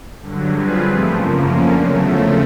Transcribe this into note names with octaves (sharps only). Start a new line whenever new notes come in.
G2 D3 F#3
G3 C4 F4 G#4 B4
G#2 F3 A3
F#2 C#3 F3 A#3
D3 F3 A#3 C#4
E2 C#3 F#3 A3
F2 C#3 F3 A3